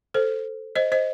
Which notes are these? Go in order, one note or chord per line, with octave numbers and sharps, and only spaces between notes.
A4 C5
C5 D#5
C5 D#5